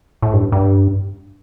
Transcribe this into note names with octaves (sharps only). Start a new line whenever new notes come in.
A2
G2
G2